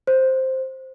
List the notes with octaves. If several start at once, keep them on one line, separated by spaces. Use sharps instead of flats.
C5